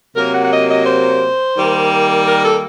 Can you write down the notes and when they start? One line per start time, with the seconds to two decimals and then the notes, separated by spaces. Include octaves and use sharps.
0.15 C3 F#3 A#3 A#4
0.33 F#5
0.43 F#5
0.50 D#5
0.69 D#5
0.86 C5
1.55 D#3 G3 A#3
2.26 A#4
2.44 A4